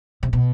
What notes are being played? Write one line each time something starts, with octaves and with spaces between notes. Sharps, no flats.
C3
B2